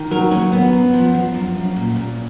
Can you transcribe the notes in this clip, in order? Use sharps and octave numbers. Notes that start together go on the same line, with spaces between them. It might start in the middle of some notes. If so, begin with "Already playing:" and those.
Already playing: D#3
F#3 A#4
D#2 C#4
F#2 B3
F#2
F3
F3
F#2
F#2
A#2
A#2